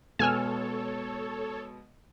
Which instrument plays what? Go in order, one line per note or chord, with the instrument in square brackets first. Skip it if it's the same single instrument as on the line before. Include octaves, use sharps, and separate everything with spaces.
[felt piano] B2 G#3 B3 [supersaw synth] A4 C#5 [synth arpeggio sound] G#5 E6 F6